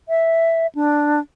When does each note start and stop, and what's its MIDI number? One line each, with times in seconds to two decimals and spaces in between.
0.09 0.67 76
0.75 1.20 62